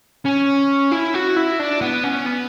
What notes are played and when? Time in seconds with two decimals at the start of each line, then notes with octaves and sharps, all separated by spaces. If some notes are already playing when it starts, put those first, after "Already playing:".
0.25 C#4
0.92 E4
1.14 F#4
1.37 E4
1.60 D4
1.81 B3
2.04 C#4
2.26 B3